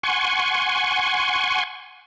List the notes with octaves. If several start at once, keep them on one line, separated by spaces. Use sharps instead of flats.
F#5 G#5 C6 C#6